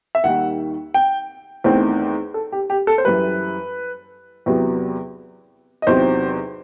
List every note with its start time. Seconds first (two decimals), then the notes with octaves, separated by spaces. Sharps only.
0.15 E5
0.24 D#2 D#3 G3 F#5
0.94 G5
1.64 E2 D#3 A3 C4 C5
2.34 A4
2.52 G4
2.70 G4
2.87 A4
2.98 C5
3.05 F#2 E3 G3 B4
4.46 E2 C3 F#3 B3
5.82 D#5
5.87 E2 C3 F#3 C4 D#4 C5